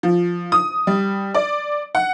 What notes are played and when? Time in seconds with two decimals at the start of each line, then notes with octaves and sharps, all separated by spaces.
0.03 F3
0.52 D#6
0.87 G3
1.35 D5
1.95 F#5